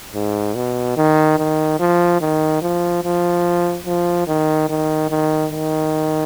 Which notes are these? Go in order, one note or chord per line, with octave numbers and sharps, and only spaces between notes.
G#2
B2
D#3
D#3
F3
D#3
F3
F3
F3
D#3
D#3
D#3
D#3